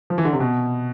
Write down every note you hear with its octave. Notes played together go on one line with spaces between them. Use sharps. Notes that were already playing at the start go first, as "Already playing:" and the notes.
F3
E3
D3
C3
B2